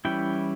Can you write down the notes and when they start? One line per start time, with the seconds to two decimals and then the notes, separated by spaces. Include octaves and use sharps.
0.05 E3 G3 C#4 E4 G5